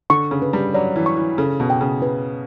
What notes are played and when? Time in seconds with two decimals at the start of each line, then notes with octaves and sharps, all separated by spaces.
0.10 D3 C#6
0.31 C#3
0.42 B4
0.53 G3
0.74 F#3 D5
0.96 E3
1.06 C#6
1.17 E3
1.38 C#3 A4
1.60 B2
1.70 G5
1.81 C#3
2.02 B4